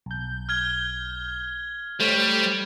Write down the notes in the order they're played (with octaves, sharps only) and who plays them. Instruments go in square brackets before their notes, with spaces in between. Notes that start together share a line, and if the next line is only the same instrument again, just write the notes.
[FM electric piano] B1 G6
[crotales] F6 G#6 G7
[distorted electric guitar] G3 [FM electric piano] A3 C5 C#5